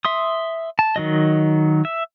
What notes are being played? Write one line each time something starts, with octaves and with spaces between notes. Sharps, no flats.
E5 C6 D#6
A5
D#3 F#3 D#5
E5